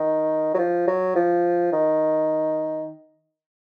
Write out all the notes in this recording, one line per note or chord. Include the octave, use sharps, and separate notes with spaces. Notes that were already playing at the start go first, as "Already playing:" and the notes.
Already playing: D#3
F#3
F3
F#3
F3
D#3